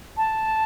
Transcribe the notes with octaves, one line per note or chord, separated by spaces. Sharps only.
A5